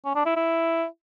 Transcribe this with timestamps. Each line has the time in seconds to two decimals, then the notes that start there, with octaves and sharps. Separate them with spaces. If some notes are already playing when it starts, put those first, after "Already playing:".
0.05 C#4
0.15 D4
0.26 E4
0.36 E4